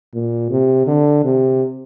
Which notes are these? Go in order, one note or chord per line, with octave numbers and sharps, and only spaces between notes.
A#2
C3
D3
C3